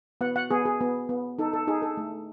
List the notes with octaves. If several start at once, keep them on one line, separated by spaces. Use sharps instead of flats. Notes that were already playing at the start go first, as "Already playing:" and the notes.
B3 F#5
F#5
B3 G#4
G#4
B3
B3
D#4 A4
A4
D#4 G#4
A4
A3